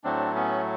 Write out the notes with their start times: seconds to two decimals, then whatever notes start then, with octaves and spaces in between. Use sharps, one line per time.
0.04 A2 F#3 A3 C4 D4
0.35 B3 C#4